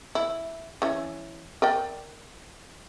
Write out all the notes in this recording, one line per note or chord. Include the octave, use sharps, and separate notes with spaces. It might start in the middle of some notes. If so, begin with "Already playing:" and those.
E4
E3 C#4
A#4 D5 G5